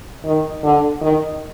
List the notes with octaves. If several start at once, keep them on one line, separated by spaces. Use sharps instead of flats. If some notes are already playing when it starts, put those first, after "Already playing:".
D#3
D3
D#3